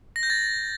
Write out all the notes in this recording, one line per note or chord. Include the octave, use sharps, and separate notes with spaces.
A#6
G6
A6